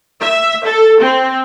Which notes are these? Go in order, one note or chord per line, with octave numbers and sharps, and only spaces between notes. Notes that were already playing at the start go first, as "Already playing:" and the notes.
E5
A4
C4